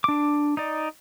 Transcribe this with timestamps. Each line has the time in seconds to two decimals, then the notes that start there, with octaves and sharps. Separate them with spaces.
0.04 D4 D6
0.57 D#4 D5